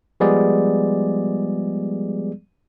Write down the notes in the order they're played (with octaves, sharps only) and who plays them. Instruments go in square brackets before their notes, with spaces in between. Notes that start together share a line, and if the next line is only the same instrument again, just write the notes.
[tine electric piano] F3 G3 G#3 B3 G#4 D5